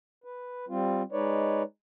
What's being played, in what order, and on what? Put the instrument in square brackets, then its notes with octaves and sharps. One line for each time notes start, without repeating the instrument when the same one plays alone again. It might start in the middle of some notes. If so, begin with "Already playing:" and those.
[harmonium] B4
G3 C4 F4
G#3 D#4 B4 C#5 D5